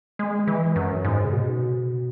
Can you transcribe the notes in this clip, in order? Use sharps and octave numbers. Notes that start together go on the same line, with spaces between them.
G#3
E3
F#2
G#2
C#3
B2